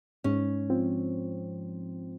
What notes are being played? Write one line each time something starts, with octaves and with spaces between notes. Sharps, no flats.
G#2 C#4
F3 C4